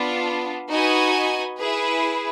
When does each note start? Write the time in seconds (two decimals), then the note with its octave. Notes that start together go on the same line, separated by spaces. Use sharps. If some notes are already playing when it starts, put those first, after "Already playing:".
Already playing: B3 D4 F4
0.69 D#4 F#4 B4 D#5 G#5
1.58 E4 G#4 B4